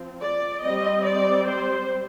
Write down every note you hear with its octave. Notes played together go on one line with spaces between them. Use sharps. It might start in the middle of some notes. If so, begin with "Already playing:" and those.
Already playing: F3 C4
D5
G3 C4 D#5
D5
C5